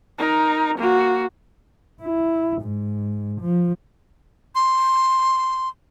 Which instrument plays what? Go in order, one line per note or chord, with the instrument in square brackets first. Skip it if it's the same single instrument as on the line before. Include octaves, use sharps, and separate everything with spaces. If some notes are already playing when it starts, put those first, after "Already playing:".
[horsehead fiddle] D#4 A#4
A#3 F#4
[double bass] E4
G#2
F3
[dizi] C6